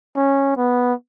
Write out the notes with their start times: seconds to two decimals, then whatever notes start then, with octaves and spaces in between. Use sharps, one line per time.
0.16 C#4
0.57 B3